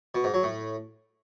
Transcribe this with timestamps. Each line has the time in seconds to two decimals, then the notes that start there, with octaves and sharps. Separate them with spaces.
0.15 B2
0.24 G#2
0.34 F#3
0.43 A2